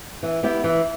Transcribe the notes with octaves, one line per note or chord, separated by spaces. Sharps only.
E3
B3 E4 G4
E3